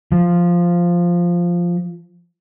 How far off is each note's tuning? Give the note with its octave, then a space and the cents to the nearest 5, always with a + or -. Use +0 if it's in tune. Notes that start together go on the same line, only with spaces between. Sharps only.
F3 +0